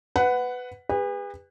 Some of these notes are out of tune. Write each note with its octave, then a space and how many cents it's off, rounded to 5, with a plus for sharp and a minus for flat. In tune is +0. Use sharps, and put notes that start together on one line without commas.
B4 +15 F#5 +0
G#4 -45 B4 +0